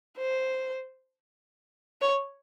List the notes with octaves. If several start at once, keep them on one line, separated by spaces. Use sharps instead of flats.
C5
C#5